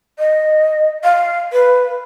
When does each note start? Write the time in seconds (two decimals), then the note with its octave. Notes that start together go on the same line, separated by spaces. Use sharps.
0.19 D#5
1.04 F5
1.53 B4